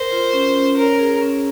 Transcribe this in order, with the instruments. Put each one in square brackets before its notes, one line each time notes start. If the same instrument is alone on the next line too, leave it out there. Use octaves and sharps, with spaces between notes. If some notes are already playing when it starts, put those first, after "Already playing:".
Already playing: [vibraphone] A#4 [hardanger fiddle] C5
[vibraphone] F4
C#4
C#4
[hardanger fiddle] A#4 [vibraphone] C#5
[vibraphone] G#4
C#4